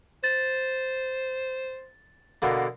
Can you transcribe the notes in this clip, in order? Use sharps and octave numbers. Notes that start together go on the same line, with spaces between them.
C5 A6
B2 D3 A#3